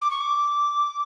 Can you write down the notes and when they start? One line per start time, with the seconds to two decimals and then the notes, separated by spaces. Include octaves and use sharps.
0.01 D6
0.10 C#6
0.20 D6